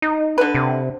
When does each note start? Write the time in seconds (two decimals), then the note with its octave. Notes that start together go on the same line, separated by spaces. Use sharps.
0.02 D#4
0.38 D3 B4
0.55 C3